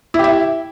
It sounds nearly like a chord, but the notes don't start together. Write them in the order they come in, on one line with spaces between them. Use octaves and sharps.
E4 G4 E5